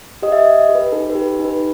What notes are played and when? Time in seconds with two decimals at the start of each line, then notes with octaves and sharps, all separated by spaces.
0.22 G4 D#5
0.32 E5
0.40 D#5
0.45 G4
0.69 G4
0.75 B4
0.92 D#4 A4
1.10 B4
1.15 G4
1.39 D#4
1.45 B4